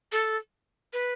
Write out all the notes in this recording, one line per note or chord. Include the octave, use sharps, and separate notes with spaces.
A4
B4